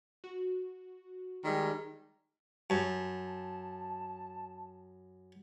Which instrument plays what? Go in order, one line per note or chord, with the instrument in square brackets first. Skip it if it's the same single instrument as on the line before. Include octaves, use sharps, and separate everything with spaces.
[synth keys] F#4
[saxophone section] D#3 G3 G#3
[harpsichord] F#2 [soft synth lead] A5